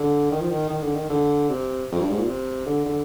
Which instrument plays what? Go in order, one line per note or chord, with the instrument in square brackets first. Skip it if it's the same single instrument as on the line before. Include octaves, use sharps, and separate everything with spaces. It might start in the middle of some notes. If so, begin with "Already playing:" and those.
Already playing: [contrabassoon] D3
D#3
F3
D#3
D#3
D3
D#3
D3
C3
F2
G2
G#2
A#2
C3
D3
D3